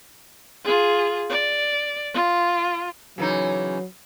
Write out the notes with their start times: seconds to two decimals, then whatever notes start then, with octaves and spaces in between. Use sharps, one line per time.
0.65 F4 G#4
1.30 D5
2.14 F4
3.18 C#3 E3 F#3 D#4